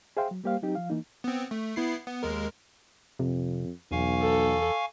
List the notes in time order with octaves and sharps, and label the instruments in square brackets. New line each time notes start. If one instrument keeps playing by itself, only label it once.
[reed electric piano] G#4 C5 E5 F5 G5 C6
F#3
G3 A#3 G4 C5 F5
F#3 C4 D#4 G4
F3 F5
E3 A#3 D#4
[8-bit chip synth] B3 C4
A3
B3 E4 C7
B3
D#2 G#3 A#4
[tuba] F2 [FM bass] C3
[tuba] B1 [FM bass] E2 [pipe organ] F5 G#5 C#6
[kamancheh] A4